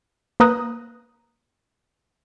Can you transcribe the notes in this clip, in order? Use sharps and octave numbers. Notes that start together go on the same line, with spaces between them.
A#3 B4 A#5 D#6 F#6